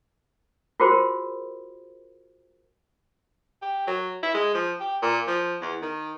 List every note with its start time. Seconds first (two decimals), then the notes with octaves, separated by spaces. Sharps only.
0.80 F4 F#4 G#4 A#4 C5
3.62 G4
3.87 F#3
4.23 E4
4.35 G#3
4.55 F3
4.80 G4
5.03 A#2
5.27 F3
5.61 E2
5.82 D#3